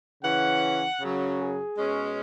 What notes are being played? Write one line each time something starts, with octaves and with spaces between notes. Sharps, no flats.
C#3 E3 C#4 F#5
F#2 C#3 F#3 C#4
G#4
B2 G#3 C#4